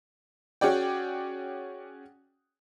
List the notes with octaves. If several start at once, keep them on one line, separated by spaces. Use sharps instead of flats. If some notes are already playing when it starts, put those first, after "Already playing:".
C#4 F#4 G#4 D5 G5